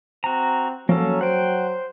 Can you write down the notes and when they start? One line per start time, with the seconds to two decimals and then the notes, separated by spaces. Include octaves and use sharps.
0.24 C4 F#4 A#5
0.89 F3 F#3 A#3 C#4 A4
1.21 C5 F#5 G5